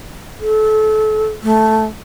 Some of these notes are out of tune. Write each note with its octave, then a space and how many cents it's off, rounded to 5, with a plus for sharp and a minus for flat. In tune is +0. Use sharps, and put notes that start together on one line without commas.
A4 -30
A3 -5